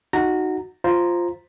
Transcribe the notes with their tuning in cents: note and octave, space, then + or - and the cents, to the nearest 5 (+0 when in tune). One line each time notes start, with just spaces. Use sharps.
D#4 +0 F#4 +0 A#5 -20
F4 +0 C5 +0 A#5 +0